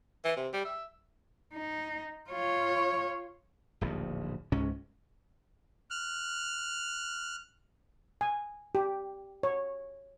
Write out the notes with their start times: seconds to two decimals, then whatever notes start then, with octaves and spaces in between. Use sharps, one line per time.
0.25 E3
0.37 C3
0.53 G3
0.65 E5
1.53 D#4
2.29 F4 C#5
3.81 D1 A#1 D#2
4.52 C#2 G#2 C3 C#4
5.90 F6 F#6
8.21 G#5
8.75 G4
9.43 C#5